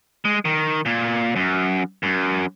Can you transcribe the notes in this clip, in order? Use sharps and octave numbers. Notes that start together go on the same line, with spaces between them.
G#3
D#3
A#2
F#2
F#2